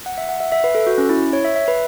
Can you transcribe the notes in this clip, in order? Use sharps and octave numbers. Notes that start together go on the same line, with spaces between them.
F#5
E5
F#5
E5
E5
B4
A4
F#4
C#4
E4
C#5
E5
E5
B4